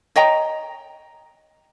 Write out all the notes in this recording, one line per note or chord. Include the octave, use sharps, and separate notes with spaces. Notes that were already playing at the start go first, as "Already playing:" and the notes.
C#5 D#5 G5 A#5